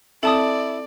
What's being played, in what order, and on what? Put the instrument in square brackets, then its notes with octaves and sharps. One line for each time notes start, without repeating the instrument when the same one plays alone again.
[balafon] C4 [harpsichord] E4 [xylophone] A4 A5 D#6 [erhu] D5